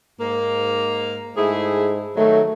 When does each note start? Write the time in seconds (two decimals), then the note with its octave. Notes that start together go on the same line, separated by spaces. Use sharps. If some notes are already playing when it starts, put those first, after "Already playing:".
0.20 G#2 A#3
1.37 G#2 A3 E4 G#4
2.17 D#3 F#3 A3